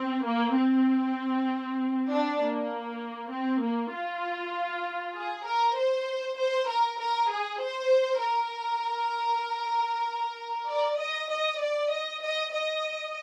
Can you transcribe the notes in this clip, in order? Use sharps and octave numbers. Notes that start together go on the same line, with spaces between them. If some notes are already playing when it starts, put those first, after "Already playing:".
Already playing: C4
A#3
C4
D4
A#3
C4
A#3
F4
G#4
A#4
C5
C5
A#4
A#4
G#4
C5
A#4
D5
D#5
D#5
D5
D#5
D#5
D#5